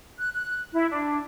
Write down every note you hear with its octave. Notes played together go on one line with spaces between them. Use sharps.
F#6
F#6
E4
D4